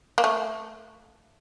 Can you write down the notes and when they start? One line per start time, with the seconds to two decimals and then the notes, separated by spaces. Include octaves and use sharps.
0.18 A#3
0.24 A3